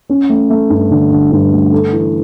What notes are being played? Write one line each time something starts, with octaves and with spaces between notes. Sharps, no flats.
C#4
A3
A3
G2
D3
D3
G2
A3
A4
E3